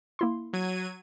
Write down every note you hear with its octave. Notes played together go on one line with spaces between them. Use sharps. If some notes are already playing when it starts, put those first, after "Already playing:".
A#3 E4 C6
F#3 G#6 D#7